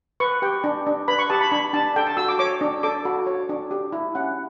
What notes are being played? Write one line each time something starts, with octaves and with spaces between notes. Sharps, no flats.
B4 C#6
G4 G5
D4
D4
B4 B5
C#6
G4 A5
B5
D4 B5
D4 A5
A4 G5
A5
F#4 E6
D6
C#5 D6
D4
A4 D6
F#4
C#5
D4
G4
E4
C#4 F#5